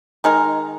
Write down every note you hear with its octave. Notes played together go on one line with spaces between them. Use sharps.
D#3 G#3 D#4 A#4